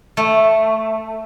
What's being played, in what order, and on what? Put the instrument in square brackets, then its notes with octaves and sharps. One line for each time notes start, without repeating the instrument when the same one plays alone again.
[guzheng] A3